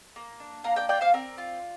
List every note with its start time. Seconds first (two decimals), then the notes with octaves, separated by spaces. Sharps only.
0.16 A#3
0.40 D4
0.64 A#3 F5 A#5
0.76 D5 G5
0.89 F4 D5 G5
1.01 C5 F5
1.14 C4 A#4 D5
1.38 F4